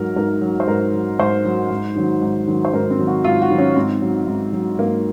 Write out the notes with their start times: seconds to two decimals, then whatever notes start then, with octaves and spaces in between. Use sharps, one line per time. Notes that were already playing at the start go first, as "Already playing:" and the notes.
Already playing: G#2 F#3 A#4
0.16 G#2 A#4
0.41 F#3
0.60 C5
0.67 G#2 A#4
0.93 F#3
1.19 G#2 C5
1.45 F#3
1.70 G#2
1.96 D#3 F#3
2.22 G#2
2.47 D#3 F#3
2.65 C5
2.73 G#2 A#4
2.90 C4
2.99 D#3 F#3
3.07 F#4
3.24 G#2 F4
3.42 F#4
3.50 D#3 F#3
3.58 C#4
3.76 G#2 C4
4.01 F#3
4.27 G#2
4.53 F#3
4.79 G#2 A#3